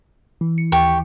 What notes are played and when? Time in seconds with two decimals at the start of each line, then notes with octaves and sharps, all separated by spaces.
0.41 E3
0.58 C#7
0.72 D#2 G4 C#6